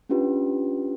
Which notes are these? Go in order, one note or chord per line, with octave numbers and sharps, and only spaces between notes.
C#4 D4 F4 G4 B4